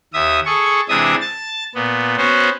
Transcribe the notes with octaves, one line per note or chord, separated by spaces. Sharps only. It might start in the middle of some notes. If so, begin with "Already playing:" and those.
D#2 E5 D#6
G#4 A4 C#6
C3 E3 G#3 D4 E5 D#6
A5 A6
A#2 B3
B3 C#4 F#4 C5